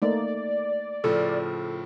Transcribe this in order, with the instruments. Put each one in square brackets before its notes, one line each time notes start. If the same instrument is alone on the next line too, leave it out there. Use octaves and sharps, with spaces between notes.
[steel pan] A3 A#3 D#4 [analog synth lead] D5
[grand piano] A2 C#3 F3 [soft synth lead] A4